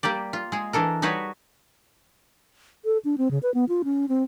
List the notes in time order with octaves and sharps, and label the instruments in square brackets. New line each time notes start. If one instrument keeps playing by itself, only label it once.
[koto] G3 A#3 G4 D5
F4
G#3 G#4
E3 D4 A4 A#4
G3 D#4 F#4 B4 C#5
[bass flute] A4
D4
C4
C#3
B4
B3
F4
C#4
C4